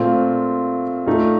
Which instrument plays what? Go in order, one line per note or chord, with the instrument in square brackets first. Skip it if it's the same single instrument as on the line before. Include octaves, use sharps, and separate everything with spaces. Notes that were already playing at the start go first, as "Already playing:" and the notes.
Already playing: [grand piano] A#2 A3 C4 F4
A#2 A3 D#4